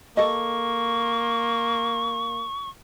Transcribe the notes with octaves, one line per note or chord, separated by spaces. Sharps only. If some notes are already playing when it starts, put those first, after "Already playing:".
A#3 A4 D#5 C#6